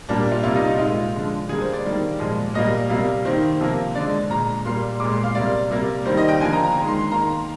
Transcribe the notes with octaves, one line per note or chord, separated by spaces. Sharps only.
A#2 G3 A#3 D4
F4
C3 G3 A#3 F4
D#4
D#4
A#2 G#3 F4
D3 F3 G#3
D3 G3 A#3 G#4
C5
D5
D#3 G3 A#3
A#2 F3 G#3
A#2 G3 A#3 D#5
C3 G3 A#3 F5
D#3 A#3 C5
C3 F3 A#3
D3 G#3 D5
A#2 G#3 A#5
A#2 G3 A#3 C6
A#2 G#3 D6
C6
F5
C3 G3 A#3 D5
C3 G3 A#3
D#3 G3 A#3 C5
D#5
G5
D3 F3 A#3 G#5
A#5
A#5
D#3 G#3
C6
C6
D#3 A#3 A#5